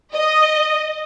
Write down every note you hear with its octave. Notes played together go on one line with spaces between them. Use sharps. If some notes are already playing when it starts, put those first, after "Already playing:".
D#5